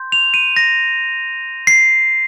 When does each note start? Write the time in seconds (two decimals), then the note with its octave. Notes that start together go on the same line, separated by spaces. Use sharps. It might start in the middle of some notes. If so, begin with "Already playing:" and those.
Already playing: C6 G6
0.12 F7
0.34 D#7
0.56 A#6
1.67 C7